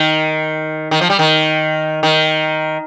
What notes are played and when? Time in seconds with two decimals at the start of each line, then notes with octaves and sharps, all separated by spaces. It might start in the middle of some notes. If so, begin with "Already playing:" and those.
Already playing: D#3
0.91 D#3
1.01 F3
1.10 G3
1.19 D#3
2.03 D#3